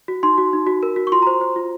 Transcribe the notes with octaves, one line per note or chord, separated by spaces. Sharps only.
F#4
D#4 C6
F#4
D#4
F#4
A#4
F#4
C#6
F4 C6
A#5
C5
C5
F4